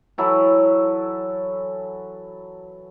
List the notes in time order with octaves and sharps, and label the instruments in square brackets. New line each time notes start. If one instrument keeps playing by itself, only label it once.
[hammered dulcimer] E3 F#3 E4 A4